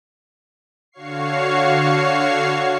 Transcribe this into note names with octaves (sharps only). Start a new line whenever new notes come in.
D3 F#4 C#5 F5 C#6 C7